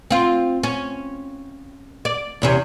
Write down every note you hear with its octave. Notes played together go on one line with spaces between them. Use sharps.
C4 F4
C#4
D5
E2 C3 C#4